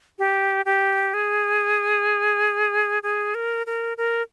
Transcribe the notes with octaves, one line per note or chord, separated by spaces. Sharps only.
G4
G4
G#4
G#4
A#4
A#4
A#4